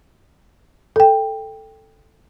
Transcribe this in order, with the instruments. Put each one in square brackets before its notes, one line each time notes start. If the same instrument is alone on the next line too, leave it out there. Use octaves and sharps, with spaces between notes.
[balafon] A4 G5